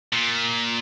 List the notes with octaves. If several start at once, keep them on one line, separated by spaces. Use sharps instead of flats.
A#2